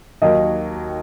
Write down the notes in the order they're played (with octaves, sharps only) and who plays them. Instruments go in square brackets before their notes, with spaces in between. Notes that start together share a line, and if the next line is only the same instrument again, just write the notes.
[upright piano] D#2 D#3 F#3 [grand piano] D#5